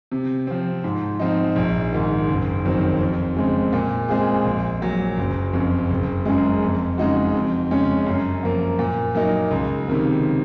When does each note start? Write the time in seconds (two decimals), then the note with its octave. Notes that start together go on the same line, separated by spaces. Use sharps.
0.12 C3
0.47 F3 C4
0.84 G#2
1.20 F3 C4 D#4
1.56 A#1
1.93 G#2 D#3
2.29 F#1
2.65 F2 D#3 F#3 C4
3.01 F2
3.37 C#3 G#3 C4
3.73 A#2
4.09 G#3 C4 F4 G#4
4.45 A#1
4.82 A#2 F#3
5.17 F#1
5.53 F2 C#3
5.90 F#1
6.26 F#2 C#3 G#3
6.62 F2
6.98 C#3 G#3 D#4 F#4
7.34 F2
7.71 C#3 G#3 C#4
8.06 F#2
8.43 F3 A#3
8.79 A#2
9.15 F#3 A#3 D#4
9.51 C#2
9.88 C3 D#3 A#3